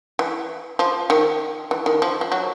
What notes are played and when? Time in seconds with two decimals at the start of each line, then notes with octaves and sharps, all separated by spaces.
0.19 E3
0.79 F3
1.10 D#3
1.71 E3
1.86 D#3
2.02 F3
2.21 F3
2.32 F#3